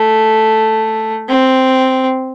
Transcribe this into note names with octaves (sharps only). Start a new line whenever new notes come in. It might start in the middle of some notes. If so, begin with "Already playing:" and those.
Already playing: A3
C4